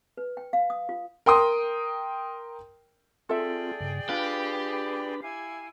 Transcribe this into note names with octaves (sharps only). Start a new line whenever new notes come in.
B4
G5
F5
D#6
F4
A#4 G5 C6 D#6
C4 F4 G#4 A4 D5 E5 G5
G2 C#3
D4 F4 G4 B4 B5
E4 F5 G#5